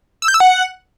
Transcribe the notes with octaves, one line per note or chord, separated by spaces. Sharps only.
E6
G6
E6
F#5